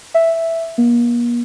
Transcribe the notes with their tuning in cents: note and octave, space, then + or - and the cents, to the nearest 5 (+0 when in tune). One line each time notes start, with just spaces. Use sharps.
E5 +0
A#3 +40